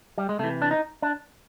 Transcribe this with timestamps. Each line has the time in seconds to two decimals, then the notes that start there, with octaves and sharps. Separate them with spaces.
0.18 G3
0.29 G#3
0.39 C3 A3
0.44 E3
0.62 D4
0.71 D#4
1.02 D4